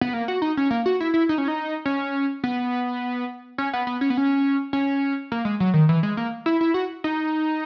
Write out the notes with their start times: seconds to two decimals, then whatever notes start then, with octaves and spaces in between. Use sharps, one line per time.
0.01 B3
0.14 A#3
0.28 F#4
0.42 D#4
0.57 C#4
0.71 A#3
0.86 F#4
1.00 E4
1.14 E4
1.29 D#4
1.38 C#4
1.48 D#4
1.85 C#4
2.44 B3
3.58 C#4
3.73 B3
3.87 B3
4.01 C#4
4.10 B3
4.17 C#4
4.73 C#4
5.32 A#3
5.45 G#3
5.60 F#3
5.74 D#3
5.89 E3
6.03 G#3
6.17 A#3
6.46 E4
6.61 E4
6.74 F#4
7.04 D#4